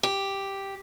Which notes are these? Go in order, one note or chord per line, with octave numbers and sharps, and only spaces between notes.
G4